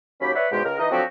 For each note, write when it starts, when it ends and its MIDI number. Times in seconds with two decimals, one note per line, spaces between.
0.21 0.33 39
0.21 0.33 54
0.21 0.33 61
0.21 0.33 67
0.21 0.33 83
0.34 0.47 71
0.34 0.47 73
0.34 0.47 74
0.34 0.47 76
0.34 0.47 78
0.34 0.47 83
0.52 0.63 40
0.52 0.63 44
0.52 0.63 47
0.52 0.63 56
0.52 0.63 67
0.64 0.75 37
0.64 0.75 70
0.79 0.87 52
0.79 0.87 63
0.79 0.87 75
0.91 1.02 50
0.91 1.02 53
0.91 1.02 54
0.91 1.02 60
0.91 1.02 66
0.91 1.02 67